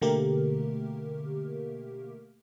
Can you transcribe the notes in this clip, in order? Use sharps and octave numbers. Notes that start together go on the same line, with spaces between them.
B2 D3 A3 A#3 G4 A#4